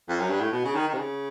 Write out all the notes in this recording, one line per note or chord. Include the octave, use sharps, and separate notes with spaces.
F2
F#2
G2
A2
B2
C#3
D#3
D#3
C3
C#3